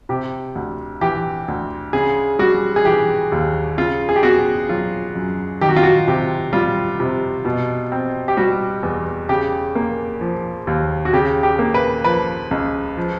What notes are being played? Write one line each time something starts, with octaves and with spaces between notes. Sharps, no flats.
C3 G4
D2
E3 G4
D2
C#3 G#4
G3 F#4
G#4
E3 G4
D#2
C#3 F4
G#4
G4
B3 F#4
F#3 F4
F#2
D#3 G4
F#4
F4
F#4
C3 G4
G3 F4
C3
B2
C4
G4
G3 F#4
E2
C#3 G4
A#3
F3
D#2
F#4
C#3 G4
G4
A#3
B4
F3 B4
C#2
F3